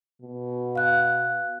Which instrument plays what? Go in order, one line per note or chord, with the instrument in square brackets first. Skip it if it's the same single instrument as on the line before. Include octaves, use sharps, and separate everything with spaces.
[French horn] B2
[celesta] F5 F#6